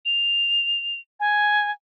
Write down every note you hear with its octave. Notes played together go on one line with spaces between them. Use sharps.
F7
G#5